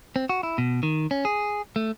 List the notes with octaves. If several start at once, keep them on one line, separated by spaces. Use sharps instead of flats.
C4
F#4
E4
B2
D#3
C#4
G#4
A3